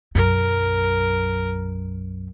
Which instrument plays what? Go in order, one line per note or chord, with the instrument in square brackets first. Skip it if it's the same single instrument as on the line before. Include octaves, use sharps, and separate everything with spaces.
[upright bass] B1 F#2 [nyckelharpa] A#4